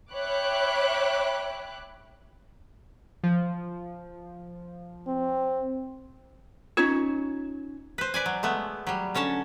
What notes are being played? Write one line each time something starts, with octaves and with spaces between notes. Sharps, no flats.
C#5 E5 G5 B5 D6 F#6
F3
C4
C#4 D#4 F4 C#5
B4 C5
B4 D5 G#5
F#3
G#3 A3 B3
F#3 G3
D3 C#4 C#5 A5